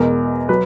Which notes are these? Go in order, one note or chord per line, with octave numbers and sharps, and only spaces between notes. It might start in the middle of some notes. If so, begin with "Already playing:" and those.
Already playing: E2 B2 G#3 A#4
F#3 B4